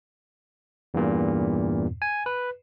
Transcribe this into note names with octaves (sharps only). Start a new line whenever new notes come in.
E2 G2 A#2
G#5
B4